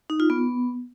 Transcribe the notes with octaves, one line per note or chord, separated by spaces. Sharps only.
D#4
F4
B3